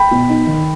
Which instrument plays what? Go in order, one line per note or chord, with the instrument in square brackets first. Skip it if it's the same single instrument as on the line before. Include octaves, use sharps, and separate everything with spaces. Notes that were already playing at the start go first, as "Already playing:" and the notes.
Already playing: [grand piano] G5 B5
B2
D#4
D#3